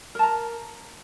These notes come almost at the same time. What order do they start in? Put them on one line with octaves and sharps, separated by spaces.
A#4 A5 A#5